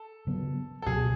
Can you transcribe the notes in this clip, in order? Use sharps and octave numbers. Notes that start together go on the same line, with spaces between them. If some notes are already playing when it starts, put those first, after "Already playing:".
Already playing: A4
C#3 F#3 B3
A4
C#2 B2 F#3 G#4